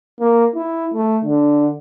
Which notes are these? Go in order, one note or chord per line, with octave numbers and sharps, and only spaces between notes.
A#3
E4
A3
D3